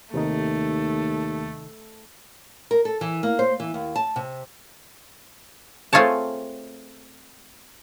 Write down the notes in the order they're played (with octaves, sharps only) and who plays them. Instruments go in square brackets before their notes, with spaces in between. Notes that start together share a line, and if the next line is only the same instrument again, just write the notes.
[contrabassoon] D#2 [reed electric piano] C3 D#3 D#4 [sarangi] A3
[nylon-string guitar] A#4
A4
E3
A#3
C5
E3
D#2
A5
C3
[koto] A3 C4 F4 G#4 C#5 A5